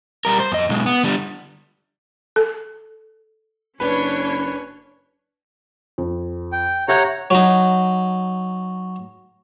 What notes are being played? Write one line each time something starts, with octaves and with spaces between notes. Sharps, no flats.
G3 A#4
C5
F2 D#5
B1 G#3
B3
D3 G3
A4
F#1 C#4 D4 B4 C#5
F2
G5
G4 C#5 E5 F#5 A#5 G6
F#3 D#4